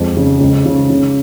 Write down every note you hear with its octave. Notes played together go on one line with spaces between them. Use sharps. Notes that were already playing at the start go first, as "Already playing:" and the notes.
Already playing: F2 G#3
C#3
C#2
C#3
C#3